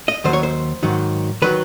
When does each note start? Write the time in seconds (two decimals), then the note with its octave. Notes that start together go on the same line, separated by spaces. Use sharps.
0.08 D#5
0.24 D#2 D#3 F#3 C5
0.33 C#5
0.43 C5
0.83 G#2 D#3 F#3
1.42 D#3 F#3 B4